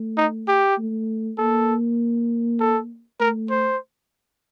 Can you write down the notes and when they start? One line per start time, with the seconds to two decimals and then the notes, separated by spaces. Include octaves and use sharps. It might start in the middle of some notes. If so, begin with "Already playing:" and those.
Already playing: A3
0.17 D#4
0.48 G4
0.78 A3
1.38 A#3 A4
2.60 A4
3.20 A3 A#4
3.50 C5